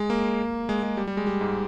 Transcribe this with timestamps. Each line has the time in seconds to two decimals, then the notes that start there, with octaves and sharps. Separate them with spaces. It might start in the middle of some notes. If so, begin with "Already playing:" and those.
Already playing: G#3
0.10 A#3
0.69 G#3
0.83 G#3
0.97 G3
1.07 G3
1.17 G#3
1.27 G3
1.41 G#2